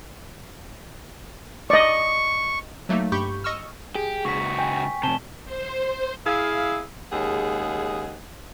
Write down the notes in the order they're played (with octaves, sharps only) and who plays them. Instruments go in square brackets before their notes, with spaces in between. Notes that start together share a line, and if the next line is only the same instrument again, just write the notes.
[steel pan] D5 D#5 [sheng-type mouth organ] C#6
[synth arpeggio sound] F#3 A3 A#3 D#4
G2 G4 B5 C#6 G6
D#5 C#6 E6 F6
[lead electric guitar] G4 [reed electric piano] G#4
[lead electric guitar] C#2 F#4 [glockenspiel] C#6 B6
[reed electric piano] G5 [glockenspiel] G#5
[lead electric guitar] F2 C3 [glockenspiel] A5 E7 G7
[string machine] C5
[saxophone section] E4 G#4 E5 F5
D#2 C#3 G#3 G#4 F#5